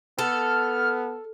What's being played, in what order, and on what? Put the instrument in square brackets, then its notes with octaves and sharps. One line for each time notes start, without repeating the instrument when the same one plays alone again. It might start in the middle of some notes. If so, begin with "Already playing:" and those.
[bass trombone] B3 [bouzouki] A4 [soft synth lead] F6